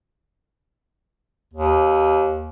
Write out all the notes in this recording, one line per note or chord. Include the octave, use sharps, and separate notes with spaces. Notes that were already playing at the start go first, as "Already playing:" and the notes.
D#2